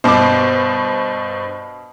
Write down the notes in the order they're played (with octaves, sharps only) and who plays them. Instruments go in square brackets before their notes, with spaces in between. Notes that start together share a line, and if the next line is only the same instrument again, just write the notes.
[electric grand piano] G2 C5 [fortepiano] B2 D6